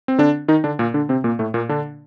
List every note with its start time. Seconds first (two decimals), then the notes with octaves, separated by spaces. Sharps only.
0.08 C4
0.18 D3 D4
0.48 D#3 D#4
0.64 D3 D4
0.79 A#2 A#3
0.94 D3 D4
1.09 C3 C4
1.24 A#2 A#3
1.39 A2 A3
1.54 A#2 A#3
1.69 D3 D4